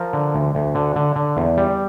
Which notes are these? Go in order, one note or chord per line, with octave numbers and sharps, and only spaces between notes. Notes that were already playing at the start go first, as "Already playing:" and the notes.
Already playing: F3 A#4
D3
D2
D2
D3
D3
D3
E2
G3